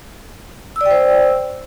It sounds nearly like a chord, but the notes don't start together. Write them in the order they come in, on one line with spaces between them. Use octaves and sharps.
E6 D5 G5 C5